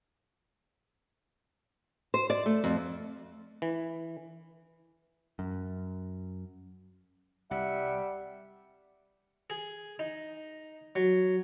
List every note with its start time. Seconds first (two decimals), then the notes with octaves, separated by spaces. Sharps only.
2.14 C5
2.30 D5
2.46 A3
2.64 F2
3.62 E3
5.39 F#2
7.51 C2 G3 E5 F#5
9.50 G#4
9.99 D#4
10.96 F#3